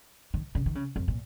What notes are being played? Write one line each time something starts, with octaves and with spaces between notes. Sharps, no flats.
D#3
C#3
D#3
C#3
F2
A#2